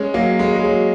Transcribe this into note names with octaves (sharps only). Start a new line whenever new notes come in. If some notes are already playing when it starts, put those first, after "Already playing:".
Already playing: G#3 C#4
F#3 A#3
G#3
G#3
F#3